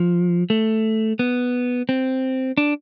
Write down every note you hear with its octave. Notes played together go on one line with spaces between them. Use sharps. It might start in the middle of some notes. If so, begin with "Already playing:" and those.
Already playing: F3
A3
B3
C4
D4